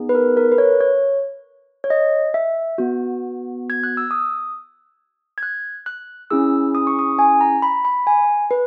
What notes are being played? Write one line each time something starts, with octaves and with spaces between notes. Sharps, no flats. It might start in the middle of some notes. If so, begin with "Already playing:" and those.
Already playing: B3 D#4 G#4
B4
A#4
A#4
B4
C#5
C#5
C#5
D#5
E5
B3 F#4
G#6
F#6
E6
D#6
G#6
F#6
F#6
C#4 E4 G#4 E6
D#6
C#6
D#6
G#5
A#5
B5
B5
G#5
B4